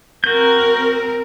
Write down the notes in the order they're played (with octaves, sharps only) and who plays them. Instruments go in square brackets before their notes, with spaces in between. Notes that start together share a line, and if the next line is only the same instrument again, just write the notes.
[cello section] C4 A#4 [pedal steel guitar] F#4 G6